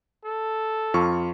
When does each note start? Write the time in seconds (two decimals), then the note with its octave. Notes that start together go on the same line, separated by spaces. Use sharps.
0.25 A4
0.94 F2 F4 C#6